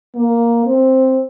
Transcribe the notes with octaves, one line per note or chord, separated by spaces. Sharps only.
A#3
C4